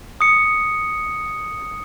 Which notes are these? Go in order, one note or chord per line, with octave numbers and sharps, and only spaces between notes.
D#6 C#7